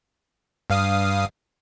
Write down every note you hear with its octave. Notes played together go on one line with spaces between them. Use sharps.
G2 F5 D#6